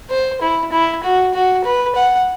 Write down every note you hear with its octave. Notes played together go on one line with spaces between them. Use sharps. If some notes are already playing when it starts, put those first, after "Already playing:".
C5
E4
E4
F#4
F#4
B4
F#5